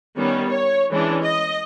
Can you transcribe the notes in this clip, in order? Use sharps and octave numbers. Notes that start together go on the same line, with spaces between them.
D#3 G3 B3 C#4
C#5
E3 G#3 C#4 D4
D#5